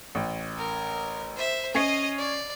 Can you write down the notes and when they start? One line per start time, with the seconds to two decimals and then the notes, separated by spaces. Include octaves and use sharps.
0.15 A1
0.57 A#4
1.37 C5 E5
1.75 C#4 C#5 D#5 D#6 C7
2.18 D5